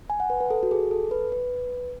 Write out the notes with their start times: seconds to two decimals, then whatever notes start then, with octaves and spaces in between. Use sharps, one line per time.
0.10 G#5
0.20 F#5
0.30 B4
0.40 B4
0.50 A4
0.63 F#4
0.71 G#4
0.91 A4
1.11 B4
1.32 B4